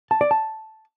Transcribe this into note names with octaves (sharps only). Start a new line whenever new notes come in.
A5
D5
A5